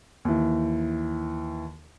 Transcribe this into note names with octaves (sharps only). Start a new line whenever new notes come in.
D#2 E3